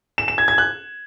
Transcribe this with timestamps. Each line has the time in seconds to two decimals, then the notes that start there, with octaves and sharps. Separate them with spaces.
0.18 E7
0.28 E7
0.38 G#6
0.48 G#6
0.58 F#6